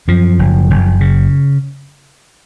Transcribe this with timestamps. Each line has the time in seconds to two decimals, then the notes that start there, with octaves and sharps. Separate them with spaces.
0.08 F#2 F3
0.39 F#1
0.70 F#1
1.01 C#3